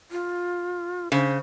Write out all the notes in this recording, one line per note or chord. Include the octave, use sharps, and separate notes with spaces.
F4
C#3 C5